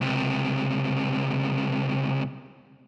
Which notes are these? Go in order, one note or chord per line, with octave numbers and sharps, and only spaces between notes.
C#2 C3